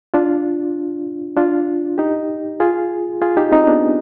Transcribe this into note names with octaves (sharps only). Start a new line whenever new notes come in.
D4 F4
D4 F4
D#4 G4
F4 G#4
F4 G#4
D#4 G4
C4 D#4
B3 D4